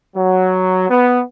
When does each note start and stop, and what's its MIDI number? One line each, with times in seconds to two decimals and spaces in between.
0.15 0.89 54
0.89 1.22 59